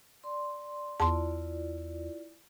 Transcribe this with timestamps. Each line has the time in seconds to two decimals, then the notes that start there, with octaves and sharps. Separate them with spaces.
0.24 D5 C6
1.00 E2 E4 F4 D5 A5 C6